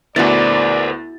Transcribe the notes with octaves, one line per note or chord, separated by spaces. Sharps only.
D2 B3 E4 F#4 A#4 C5 D5 A6